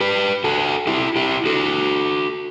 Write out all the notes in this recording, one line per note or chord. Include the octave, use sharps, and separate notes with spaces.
G4 B4
F#4 A4
E4 G4
E4 G4
F#4 A4